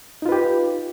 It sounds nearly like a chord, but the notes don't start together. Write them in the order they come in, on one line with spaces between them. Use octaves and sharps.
D#4 F4 B4 G4